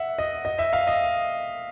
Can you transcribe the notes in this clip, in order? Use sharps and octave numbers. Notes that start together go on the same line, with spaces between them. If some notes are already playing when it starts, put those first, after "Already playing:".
Already playing: E5 F#5
D#5
D#5
E5
F5
D#5